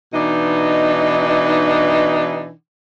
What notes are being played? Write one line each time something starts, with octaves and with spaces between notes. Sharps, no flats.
B2 E3 D4 D#4